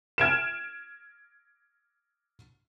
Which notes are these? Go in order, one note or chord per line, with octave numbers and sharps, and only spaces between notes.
F6 G#6 D7 E7